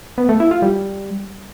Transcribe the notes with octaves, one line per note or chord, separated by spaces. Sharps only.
B3
A3
E4
F4
G3